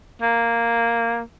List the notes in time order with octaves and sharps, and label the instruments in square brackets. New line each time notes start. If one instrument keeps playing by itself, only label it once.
[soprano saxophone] A#3